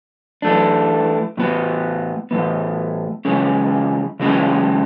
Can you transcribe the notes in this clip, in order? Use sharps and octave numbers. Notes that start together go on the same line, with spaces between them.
E3 A3 D4
A2 E3 B3
A2 E3 B3
C#3 E3 G#3 C#4
C#3 E3 G#3 C#4